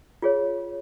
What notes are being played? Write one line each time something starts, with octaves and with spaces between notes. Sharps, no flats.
F4 G#4 C#5